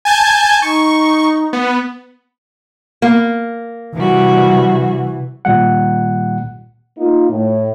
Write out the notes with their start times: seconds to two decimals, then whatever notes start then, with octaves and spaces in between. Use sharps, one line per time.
0.05 G#5 A5 G6
0.62 D#4 C#6
1.53 B3
3.02 A#3
3.95 C3 E3 G3 F#4
5.45 A#2 D#3 G3 F#5
6.98 A#3 D#4 F4
7.30 A2